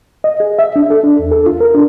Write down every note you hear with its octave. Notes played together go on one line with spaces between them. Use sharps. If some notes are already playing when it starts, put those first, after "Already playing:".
D#5
G#4
E5
D4
A4
D4
E2
A4
F4
A#4
D4